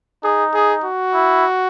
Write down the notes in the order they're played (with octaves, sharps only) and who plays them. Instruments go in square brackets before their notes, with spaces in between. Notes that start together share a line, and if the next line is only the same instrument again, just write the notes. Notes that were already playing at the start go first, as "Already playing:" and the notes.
[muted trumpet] D#4 [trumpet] G#4
[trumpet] G#4
F#4
[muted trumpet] E4